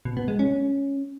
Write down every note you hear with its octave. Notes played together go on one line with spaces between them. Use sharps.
B2
B3
G#3
C#4